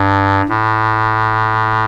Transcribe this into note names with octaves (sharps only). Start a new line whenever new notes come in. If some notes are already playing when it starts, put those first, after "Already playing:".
Already playing: G2
A2